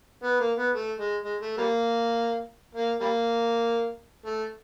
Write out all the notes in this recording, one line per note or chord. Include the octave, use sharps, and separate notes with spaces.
B3
A#3
B3
A3
G#3
G#3
A3
G3 A#3
A#3
G3 A#3
A3